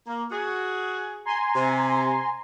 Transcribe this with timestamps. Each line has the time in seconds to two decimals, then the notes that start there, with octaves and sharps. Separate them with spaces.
0.07 A#3
0.31 F#4 G#4
1.26 G#5 A#5 C6
1.55 C3